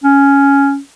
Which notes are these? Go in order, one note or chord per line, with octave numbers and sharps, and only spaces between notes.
C#4